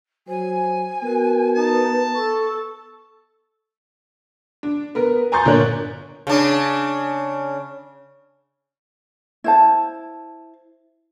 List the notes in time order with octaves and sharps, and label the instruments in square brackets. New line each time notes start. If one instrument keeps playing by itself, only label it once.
[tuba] F#3 [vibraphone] C5 [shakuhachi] G#5
[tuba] B3 [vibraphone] F#4 A#4
[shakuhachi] D#4 [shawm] A5
[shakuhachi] A4 [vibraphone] C#6
[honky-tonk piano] D4
B3 A#4
G#5 A#5 C6 C#6 G6 A6
G1 A#2 D4 A#4 C#5 F#6
[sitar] C#3 D4
[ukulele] E4 C5 A5